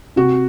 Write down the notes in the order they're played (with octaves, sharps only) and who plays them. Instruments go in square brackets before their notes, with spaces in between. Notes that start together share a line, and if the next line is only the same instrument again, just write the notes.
[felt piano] C3 F#4